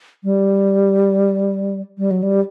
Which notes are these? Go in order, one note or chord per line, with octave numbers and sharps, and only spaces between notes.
G3
G3
F#3
G3